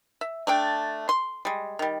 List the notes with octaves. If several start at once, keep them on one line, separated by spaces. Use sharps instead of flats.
E5
A3 D4 G5
C6
G3 G#3
D#3 G3